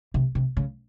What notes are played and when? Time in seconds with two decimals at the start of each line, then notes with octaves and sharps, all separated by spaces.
0.14 C3
0.35 C3
0.57 C#3